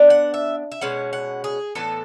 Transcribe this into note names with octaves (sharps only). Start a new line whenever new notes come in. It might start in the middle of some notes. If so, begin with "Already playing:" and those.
Already playing: B3 D4
F#5
E5
E5
B2 G#3 C#4 F#5
F#5
G#4
A2 E3 B3 A4